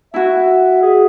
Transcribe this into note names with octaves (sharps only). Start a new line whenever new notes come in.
E4 F#4 E5
G#4